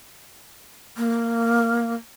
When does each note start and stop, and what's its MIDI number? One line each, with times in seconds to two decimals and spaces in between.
0.97 1.95 58